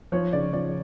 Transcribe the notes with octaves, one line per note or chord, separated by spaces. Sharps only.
F3 C#5
C#3 D5
F3 D5